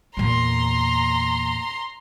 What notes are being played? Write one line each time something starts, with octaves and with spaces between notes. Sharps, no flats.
E2 A#2 A#5 C6